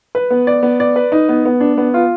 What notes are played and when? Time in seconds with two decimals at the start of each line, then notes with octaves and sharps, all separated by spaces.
0.15 B4
0.30 B3
0.47 D5
0.63 B3
0.80 D5
0.96 B4
1.12 D#4
1.29 B3
1.45 B3
1.60 D4
1.78 B3
1.94 F4